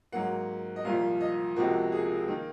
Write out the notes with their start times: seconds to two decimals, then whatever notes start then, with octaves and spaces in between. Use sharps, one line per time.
0.12 G#2 F#3 A#3 F#5
0.76 D#5
0.85 C2 A#2 F3 F5
1.21 D#5
1.56 C#2 C3 F3 A#3 F#4
1.92 G#4
2.28 D#3 A#3